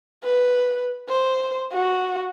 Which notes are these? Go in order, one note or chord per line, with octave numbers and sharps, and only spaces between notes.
B4
C5
F#4